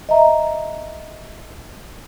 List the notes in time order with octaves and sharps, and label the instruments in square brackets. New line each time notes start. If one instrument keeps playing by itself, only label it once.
[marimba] D#5 E5 A#5